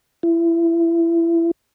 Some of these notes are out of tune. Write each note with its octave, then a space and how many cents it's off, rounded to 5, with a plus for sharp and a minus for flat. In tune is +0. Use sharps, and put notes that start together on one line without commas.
E4 +25